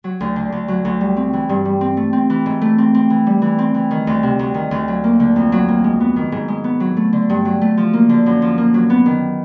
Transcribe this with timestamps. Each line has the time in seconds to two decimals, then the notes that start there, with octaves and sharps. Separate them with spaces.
0.04 F#3
0.21 D2
0.36 D3
0.52 D2
0.68 F#3
0.85 D2
1.01 G3
1.17 C4
1.33 E3
1.49 G2
1.65 G3
1.81 C4
1.97 A3
2.13 C4
2.30 E3
2.46 G#2
2.61 A3
2.78 C4
2.95 C4
3.10 E3
3.27 G3
3.42 E3
3.58 C4
3.75 E3
3.91 D#3
4.07 D2
4.23 C3
4.39 D2
4.54 D#3
4.71 D2
4.88 F#3
5.04 A#3
5.20 D3
5.36 F2
5.52 F#3
5.68 A#3
5.84 G#3
6.00 B3
6.16 D#3
6.32 G#2
6.48 G#3
6.64 B3
6.80 F#3
6.97 A3
7.13 D3
7.30 G2
7.45 F#3
7.61 A3
7.77 F3
7.93 A#3
8.09 D3
8.26 F#2
8.42 F3
8.58 A#3
8.74 F#3
8.90 B3
9.06 D#3